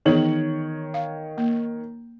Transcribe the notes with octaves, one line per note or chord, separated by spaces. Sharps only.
D#3 E3 B3 G#4 C#5 F#7
F5
A#3